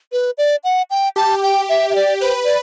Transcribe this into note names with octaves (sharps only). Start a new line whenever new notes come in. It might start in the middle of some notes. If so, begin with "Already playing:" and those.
B4
D5
F#5
G5
G4 A5
G5
E5
E5
D5
B4 C5
D5